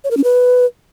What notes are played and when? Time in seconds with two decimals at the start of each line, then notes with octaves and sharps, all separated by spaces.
0.04 C#5
0.11 A#4
0.17 C#4
0.24 B4